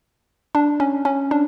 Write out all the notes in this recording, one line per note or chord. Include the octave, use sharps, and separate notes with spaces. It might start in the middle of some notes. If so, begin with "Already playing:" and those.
D4
C#4
C#4
D4